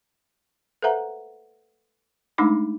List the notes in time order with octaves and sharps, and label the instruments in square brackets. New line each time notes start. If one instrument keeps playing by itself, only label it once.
[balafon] A4 B4 C5 E5 F#5 A#5
G#3 A3 D4 D#4 B5 D6